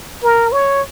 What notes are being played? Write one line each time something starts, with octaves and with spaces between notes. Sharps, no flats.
A#4
C#5